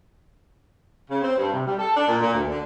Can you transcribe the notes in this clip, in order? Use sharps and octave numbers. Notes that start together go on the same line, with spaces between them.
C#3
C4
G2
C3
G3
A4
D4
A#2
A#2
D2
D3